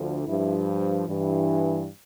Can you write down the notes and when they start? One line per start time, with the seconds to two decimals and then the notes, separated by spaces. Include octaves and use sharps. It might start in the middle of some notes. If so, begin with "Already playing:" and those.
Already playing: D2 D3 F3
0.27 G2 F3 E4
1.08 G2 E3